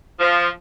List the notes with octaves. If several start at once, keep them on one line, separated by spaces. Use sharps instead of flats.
F3